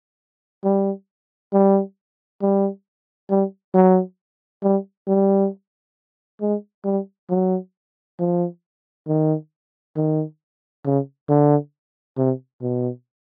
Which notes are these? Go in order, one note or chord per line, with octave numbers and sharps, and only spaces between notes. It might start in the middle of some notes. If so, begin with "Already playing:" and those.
G3
G3
G3
G3
F#3
G3
G3
G#3
G3
F#3
F3
D#3
D#3
C#3
D3
C3
B2